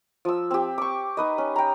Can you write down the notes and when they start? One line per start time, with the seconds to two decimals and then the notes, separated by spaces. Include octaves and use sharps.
0.25 F3 E6
0.51 C4 G4
0.78 C#6 D6
1.17 D#4 B4 D#5
1.38 C#4
1.56 G5 A#5